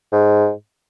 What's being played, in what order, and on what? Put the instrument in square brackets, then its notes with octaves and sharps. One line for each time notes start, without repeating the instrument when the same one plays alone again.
[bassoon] G#2